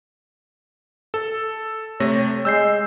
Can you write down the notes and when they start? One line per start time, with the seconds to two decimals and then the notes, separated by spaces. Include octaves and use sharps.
1.14 A4
2.00 C3 A3 C#5 A#6
2.45 G#3 E6 G6 C7